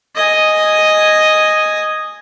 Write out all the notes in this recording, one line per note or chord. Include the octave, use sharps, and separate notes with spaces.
D#5 G#5